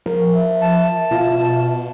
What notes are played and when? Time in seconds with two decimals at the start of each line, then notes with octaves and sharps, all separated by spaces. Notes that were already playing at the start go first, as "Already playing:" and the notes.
0.06 F3 A#4
0.33 E5
0.61 A5
1.11 B2 F4 F5